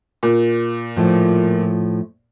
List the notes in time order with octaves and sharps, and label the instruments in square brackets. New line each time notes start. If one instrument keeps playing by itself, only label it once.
[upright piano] A#2
[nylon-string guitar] A2 F3 A3